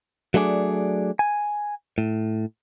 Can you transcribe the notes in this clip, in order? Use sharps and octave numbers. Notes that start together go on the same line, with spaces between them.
F#3 A3 D4 G#4 D5
G#5
A2